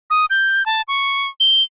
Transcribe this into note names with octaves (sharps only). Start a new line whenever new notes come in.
D#6
G6
A5
C#6
G7